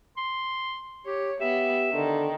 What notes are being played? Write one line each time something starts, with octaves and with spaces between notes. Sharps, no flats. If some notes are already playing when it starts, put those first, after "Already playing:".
C6
G4 C#5
B3 G4 E5
D3 D#3